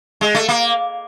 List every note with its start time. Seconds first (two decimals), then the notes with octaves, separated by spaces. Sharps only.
0.21 G#3
0.35 A3
0.48 A#3